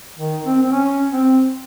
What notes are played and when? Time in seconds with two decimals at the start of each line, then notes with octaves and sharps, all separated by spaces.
0.19 D#3
0.45 C4
0.63 C4
0.72 C#4
1.12 C4